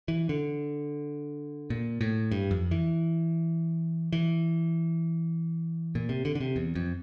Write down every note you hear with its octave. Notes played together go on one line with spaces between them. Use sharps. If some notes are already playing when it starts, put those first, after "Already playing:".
E3
D3
A#2
A2
G2
F2
E3
E3
A#2
C3
D3
D3
C3
E2
F2